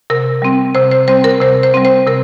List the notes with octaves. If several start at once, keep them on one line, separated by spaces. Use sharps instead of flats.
C3 A#4
G3 C4
C3 C5
C5
G3 C4 C5
A#4
C3 C5
C5
G3 C4
C5
C3 A#4